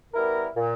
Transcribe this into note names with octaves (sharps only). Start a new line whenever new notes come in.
G3 B3 E4 A#4
A#2